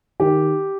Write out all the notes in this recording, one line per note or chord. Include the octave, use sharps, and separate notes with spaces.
D#3 G4